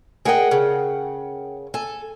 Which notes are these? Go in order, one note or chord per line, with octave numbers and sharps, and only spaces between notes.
G#4 A#4 D#5 F#5 G5
C#3
A4 G#5